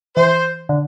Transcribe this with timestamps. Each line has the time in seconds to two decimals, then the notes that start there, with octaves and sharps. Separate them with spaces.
0.16 E3 C5
0.69 D3